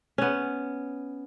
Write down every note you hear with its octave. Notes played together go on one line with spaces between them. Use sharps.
B3 C#4